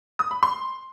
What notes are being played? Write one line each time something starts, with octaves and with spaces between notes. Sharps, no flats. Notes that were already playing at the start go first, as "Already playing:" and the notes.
D#6
B5
C6